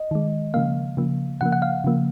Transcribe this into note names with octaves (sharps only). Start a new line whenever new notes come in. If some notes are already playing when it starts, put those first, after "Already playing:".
Already playing: D#5
D#3 G#3
C#3 F3 A#3 F5
C#3 F3 A#3
C#3 F3 A#3 F#5
F#5
F5
C#3 F3 A#3